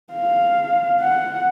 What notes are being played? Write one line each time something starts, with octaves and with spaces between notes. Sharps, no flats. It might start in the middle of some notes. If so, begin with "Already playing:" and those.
F5
F#5